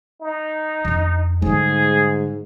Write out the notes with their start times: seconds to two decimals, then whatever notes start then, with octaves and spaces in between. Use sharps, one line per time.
0.22 D#4
0.85 F2 D4
1.42 G#2 D3 G3 G#4